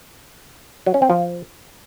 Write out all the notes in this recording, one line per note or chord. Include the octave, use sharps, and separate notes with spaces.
F#3
C#4
C4
F3